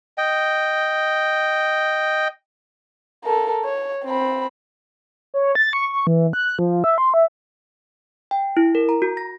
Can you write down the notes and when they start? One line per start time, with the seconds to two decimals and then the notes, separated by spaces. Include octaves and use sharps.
0.18 D#5 G5
3.24 A4 A#4
3.65 C#5
4.04 C4 B5
5.34 C#5
5.55 A6
5.73 C#6
5.93 C#6
6.07 E3
6.33 F#6
6.59 F3
6.84 E5
6.98 C6
7.14 E5
8.31 G5
8.57 E4
8.75 A#4
8.89 A#5
9.02 F#4
9.17 A#6